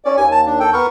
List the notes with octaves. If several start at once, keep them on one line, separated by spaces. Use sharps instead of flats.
C#4 D5
D#2 G#5
A5
D4
A4 G5
B3 A#4 C#6